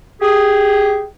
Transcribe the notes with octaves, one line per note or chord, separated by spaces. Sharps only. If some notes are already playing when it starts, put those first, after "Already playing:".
G4 G#4